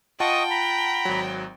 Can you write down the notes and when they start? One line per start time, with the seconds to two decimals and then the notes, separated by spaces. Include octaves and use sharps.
0.20 F4 D#5 F#5 G5 A5 C#6 D#6
0.50 A#5 B5
1.05 G#1 F#3